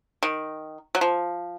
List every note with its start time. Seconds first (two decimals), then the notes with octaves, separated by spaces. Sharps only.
0.23 D#3
0.95 F#3
1.01 F3